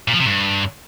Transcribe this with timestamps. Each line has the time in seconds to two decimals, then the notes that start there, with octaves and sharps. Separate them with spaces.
0.08 A#2
0.14 F3
0.20 C3
0.26 G2